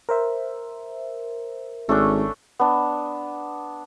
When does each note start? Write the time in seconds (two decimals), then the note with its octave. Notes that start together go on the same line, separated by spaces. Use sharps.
0.09 A#4 C5 E5
1.89 G#1 A3 C#4 D4
2.59 B3 D4